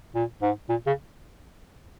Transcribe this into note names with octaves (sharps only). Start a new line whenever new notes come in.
A#2
G#2
A#2
C#3